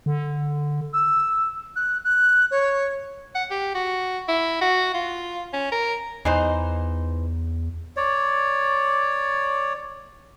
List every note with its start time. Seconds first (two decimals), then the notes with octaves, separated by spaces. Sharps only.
0.06 D3
0.92 E6
1.75 F#6
2.04 F#6
2.50 C#5
3.35 F#5
3.51 G4
3.75 F#4
4.28 E4
4.61 F#4
4.94 F4
5.53 C#4
5.72 A#4
6.25 E2 E3 D#4 C5
7.96 C#5 D5